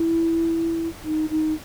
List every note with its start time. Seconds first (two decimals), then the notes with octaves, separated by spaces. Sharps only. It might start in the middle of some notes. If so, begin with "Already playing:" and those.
Already playing: E4
1.04 D#4
1.30 D#4